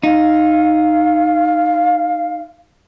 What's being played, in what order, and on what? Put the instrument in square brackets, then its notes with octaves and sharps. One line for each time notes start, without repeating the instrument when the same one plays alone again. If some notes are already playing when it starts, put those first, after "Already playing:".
[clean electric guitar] D#4 [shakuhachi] F5